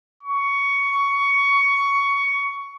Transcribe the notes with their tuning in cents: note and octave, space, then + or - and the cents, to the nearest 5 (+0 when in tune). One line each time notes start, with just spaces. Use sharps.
C#6 +15